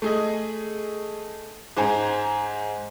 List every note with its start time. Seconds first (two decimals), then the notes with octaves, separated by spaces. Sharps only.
0.02 A3 G#4 D#5
1.77 G#2 C5 G#5 A#5